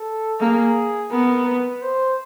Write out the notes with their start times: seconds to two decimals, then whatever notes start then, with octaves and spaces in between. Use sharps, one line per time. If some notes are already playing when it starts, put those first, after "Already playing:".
Already playing: A4
0.40 A#3 G#4
1.12 B3 A#4
1.47 B4
1.82 C5